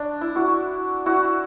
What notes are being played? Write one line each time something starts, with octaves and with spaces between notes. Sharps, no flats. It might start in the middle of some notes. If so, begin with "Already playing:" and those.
Already playing: D4
E4
E4 F#4
E4 F#4